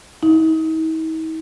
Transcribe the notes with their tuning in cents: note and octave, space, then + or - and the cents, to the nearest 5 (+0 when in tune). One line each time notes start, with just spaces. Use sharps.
D#4 +45